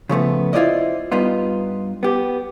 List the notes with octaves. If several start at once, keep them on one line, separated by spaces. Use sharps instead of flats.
C#3 F3 A3 B3
E4 F4 A4 C5 D5 D#5
G2 B3 D#4 F4
B3 G4